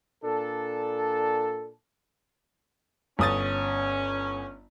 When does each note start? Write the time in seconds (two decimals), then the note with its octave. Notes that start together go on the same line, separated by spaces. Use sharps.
0.24 A#2 D4 A4
3.19 G1 C#4 D#6 A6